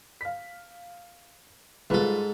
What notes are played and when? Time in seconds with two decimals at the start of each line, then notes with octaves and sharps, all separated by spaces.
0.21 F5 B6
1.90 G#2 G3 F4 A4 B4